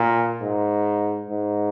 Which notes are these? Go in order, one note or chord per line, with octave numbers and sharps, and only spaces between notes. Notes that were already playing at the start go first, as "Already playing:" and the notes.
Already playing: A#2
G#2
G#2